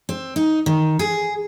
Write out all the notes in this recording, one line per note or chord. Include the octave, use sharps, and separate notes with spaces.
C4
D#4
D#3
G#4